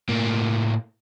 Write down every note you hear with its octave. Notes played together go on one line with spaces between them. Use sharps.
A2 A#3